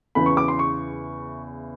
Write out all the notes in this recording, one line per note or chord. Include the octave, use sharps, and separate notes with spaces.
E2 C#3 E3 B5
C#6
D6
C6
C#6